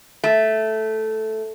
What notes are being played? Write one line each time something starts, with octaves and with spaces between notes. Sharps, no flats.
A3